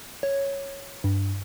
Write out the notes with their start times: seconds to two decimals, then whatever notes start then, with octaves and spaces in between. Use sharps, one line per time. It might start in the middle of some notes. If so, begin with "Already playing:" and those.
0.23 C#5
1.04 G2